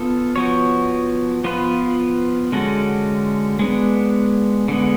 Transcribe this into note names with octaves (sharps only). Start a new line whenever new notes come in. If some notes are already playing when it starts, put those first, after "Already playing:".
Already playing: B3 F4 A4
F3 B3 F#4 C#5
F3 B3 F4 B4
D3 G#3 C#4 F#4 A4
G#3 B3 D4
D3 G#3 B3